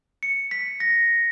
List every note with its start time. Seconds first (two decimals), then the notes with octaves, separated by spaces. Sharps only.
0.23 C#7
0.51 B6
0.80 A#6